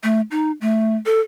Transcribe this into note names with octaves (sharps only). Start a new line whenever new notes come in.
A3
D#4
A3
A4